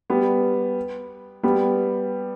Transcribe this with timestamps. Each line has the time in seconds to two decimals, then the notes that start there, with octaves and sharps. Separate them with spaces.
0.10 G3 B3
1.43 G3 B3